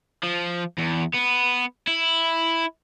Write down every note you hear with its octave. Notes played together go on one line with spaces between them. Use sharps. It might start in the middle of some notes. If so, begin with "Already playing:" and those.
F3
E2
B3
E4